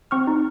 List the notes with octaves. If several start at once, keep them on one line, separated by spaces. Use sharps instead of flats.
C4 C#6 F6
D#4